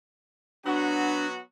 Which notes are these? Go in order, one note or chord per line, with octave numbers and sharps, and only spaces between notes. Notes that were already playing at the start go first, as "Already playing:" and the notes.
F#3 B3 D4 F#4